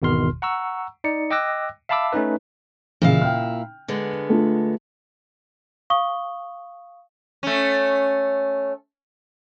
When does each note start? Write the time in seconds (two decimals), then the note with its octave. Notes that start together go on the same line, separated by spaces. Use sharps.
0.02 G#1 E2 B2 D#3 C6 F6
0.42 F#5 A#5 C#6 E6
1.04 D#4 D5 C#7
1.30 D#5 G5 D6 E6 F#6 A#6
1.89 E5 F5 A5 B5 D6 E6
2.13 A3 C#4 D#4 B4
3.02 A1 A#2 C#3 E4 F5
3.22 G5 F6
3.88 D3 G#3 B3
4.29 A3 D4 F4
5.90 F5 C#6 D#6 G7
7.43 A3 C#4